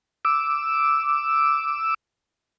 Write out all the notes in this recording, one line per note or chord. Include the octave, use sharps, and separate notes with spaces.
D6 E6